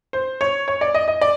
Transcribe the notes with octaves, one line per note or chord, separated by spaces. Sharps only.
C5
C#5
C#5
D5
D#5
D#5
D5